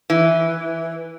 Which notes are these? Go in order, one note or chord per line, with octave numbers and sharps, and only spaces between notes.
E3